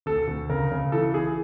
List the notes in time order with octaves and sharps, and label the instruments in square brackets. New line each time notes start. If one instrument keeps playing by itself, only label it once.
[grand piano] D2 A4
D2
C#3 A#4
C#3
E3 A4
E3 G#4